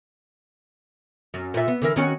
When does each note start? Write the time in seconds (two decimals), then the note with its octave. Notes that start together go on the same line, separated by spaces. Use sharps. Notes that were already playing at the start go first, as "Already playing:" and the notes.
1.34 F#2
1.54 A#2 E5
1.68 B3
1.82 D3 E3 A#4
1.96 D#3 C#4 F#4